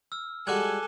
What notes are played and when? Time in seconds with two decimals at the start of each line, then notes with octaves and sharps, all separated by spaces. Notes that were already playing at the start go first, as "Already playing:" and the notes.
0.12 E6 F6
0.47 G3 G#3 F#4 A4 G#5 D6 F#6 G#6